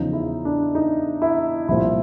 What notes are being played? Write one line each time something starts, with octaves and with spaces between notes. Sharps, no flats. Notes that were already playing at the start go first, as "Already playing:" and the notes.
Already playing: E2 C#3 F3 D#4
E4
D4
D#4
E4
C2 A#2 F3 E4